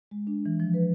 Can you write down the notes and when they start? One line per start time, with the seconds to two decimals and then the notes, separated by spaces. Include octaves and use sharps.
0.11 G#3
0.27 D4
0.46 E3
0.60 F3
0.74 B4